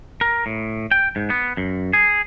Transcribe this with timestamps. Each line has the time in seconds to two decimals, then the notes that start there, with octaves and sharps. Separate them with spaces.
0.21 A#4
0.46 A2
0.91 G5
1.16 G#2
1.30 B3
1.57 F#2
1.93 G#4